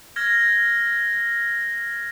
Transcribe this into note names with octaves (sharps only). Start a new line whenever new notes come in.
F6 G#6 A#6